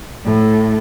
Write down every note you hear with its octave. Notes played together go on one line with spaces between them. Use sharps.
A2